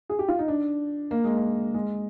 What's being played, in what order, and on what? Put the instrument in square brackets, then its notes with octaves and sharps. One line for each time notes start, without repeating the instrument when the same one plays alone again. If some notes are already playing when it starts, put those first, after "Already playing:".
[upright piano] G#4
G4
F4
D#4
D4
A#3
G#3
A#3
G#3